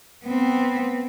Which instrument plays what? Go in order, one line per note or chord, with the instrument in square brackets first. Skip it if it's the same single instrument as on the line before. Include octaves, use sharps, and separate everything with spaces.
[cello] B3 C4